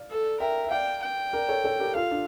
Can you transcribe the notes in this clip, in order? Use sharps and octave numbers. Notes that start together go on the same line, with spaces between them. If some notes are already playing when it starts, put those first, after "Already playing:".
Already playing: D5 F5
A4
A#4 E5 G5
E5
D5 F5 G5
G5
A#4 D5
A4 C#5
A4 C#5
G4 A#4
F4 A4 F5
D4 F4